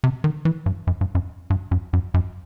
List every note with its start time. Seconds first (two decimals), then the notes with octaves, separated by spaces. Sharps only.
0.04 C3
0.24 D#3
0.45 E3
0.66 G2
0.87 F#2
1.01 G2
1.15 F#2
1.50 G2
1.71 F#2
1.93 F#2
2.14 F#2